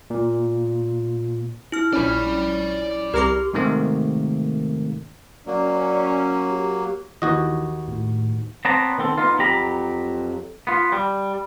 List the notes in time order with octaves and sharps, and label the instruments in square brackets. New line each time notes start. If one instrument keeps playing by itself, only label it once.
[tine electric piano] A#2
[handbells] E4 F6
[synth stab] A#1 C#4 [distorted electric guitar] D5 B5
[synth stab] C2 A#4 F6 [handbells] G4 G#4 D6
[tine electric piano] G#2 C3 D#3 A3 A#3
[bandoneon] F#3 A#3 [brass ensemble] C#4 [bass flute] D5
[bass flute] G4
[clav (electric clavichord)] D#2 F#4 D#5 [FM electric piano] E3
[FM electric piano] A2
[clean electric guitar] B3 C4 C#5 G5 A5 A#5
D#3 B3 C4 A4
B3 D#4 F4
F2 F#3 G4 A#5 B5
B3 F4
G3